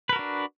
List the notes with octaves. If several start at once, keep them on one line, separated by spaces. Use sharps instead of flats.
D4 F#4 A#4 B4